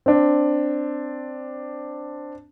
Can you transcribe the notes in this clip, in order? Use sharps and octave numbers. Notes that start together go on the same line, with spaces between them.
C4 D4